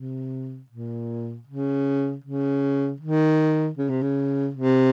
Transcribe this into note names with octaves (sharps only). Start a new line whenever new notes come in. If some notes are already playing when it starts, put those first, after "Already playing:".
Already playing: C3
A#2
C#3
C#3
D#3
C#3
C3
C#3
C3